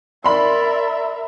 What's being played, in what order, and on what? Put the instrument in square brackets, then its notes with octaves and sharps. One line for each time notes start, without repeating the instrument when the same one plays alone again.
[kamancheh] A#4 E5 [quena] D5 [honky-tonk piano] B5 C6